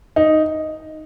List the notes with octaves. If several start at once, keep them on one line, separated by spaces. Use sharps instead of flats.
D#4